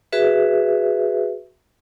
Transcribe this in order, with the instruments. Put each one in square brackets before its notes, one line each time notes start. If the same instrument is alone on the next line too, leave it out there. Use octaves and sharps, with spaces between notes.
[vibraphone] F#4 G#4 B4 E5